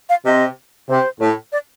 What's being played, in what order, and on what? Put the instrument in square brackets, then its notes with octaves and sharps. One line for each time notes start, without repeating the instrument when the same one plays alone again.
[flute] F5
[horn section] C3 [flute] D#5
[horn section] C3 [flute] C5
[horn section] A2
[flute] D5